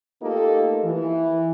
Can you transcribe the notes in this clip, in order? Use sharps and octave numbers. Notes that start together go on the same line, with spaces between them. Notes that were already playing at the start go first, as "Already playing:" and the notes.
A3 A#3 D#4 F4 G4 A4
E3